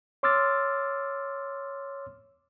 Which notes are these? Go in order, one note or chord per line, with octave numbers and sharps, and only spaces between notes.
C#5 C6 D6 E6 F6 A6